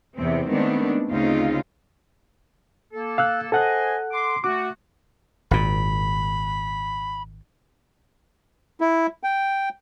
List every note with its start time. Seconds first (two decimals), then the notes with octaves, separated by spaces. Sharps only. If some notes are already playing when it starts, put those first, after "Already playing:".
0.16 E2 C3 C4
0.48 D#3 G#3 A3 B3 C4 D4
1.10 D2 C#3 C4 D#4 F4
2.93 A#3 A4
3.18 F5 E6 F#6
3.52 A4 C5 D#5 F#5 G#5 F#6
4.12 C6 D6
4.44 A3 F#4 D6
5.51 G#1 A#2 B5
8.81 E4
9.23 G5